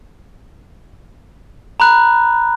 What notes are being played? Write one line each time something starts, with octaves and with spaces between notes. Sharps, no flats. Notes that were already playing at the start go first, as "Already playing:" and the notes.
A#5 B5 F#6